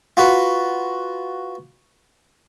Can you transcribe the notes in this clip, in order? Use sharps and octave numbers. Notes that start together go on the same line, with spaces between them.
F4 F#4 B4